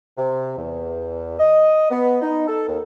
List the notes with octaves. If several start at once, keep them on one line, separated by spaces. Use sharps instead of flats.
C3
E2
D#5
B3
D#4
A4
D#2